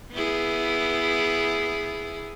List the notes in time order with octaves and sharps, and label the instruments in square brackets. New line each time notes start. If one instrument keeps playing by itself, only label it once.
[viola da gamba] B3 E4 G#4